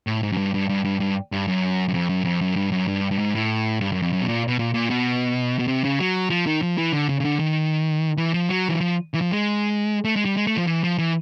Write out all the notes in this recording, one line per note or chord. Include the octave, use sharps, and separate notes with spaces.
A2
G#2
F#2
G2
G2
G2
G2
G2
G2
F#2
F#2
F2
F#2
F2
F#2
G2
F#2
G2
G2
G#2
A2
G2
F#2
F2
F#2
B2
A#2
B2
A#2
A#2
B2
B2
C3
C#3
F#3
F3
D#3
F3
E3
D3
C#3
C#3
D3
D#3
E3
F3
F#3
E3
F3
E3
F3
G#3
A3
G#3
G3
G#3
A3
F3
E3
F3
E3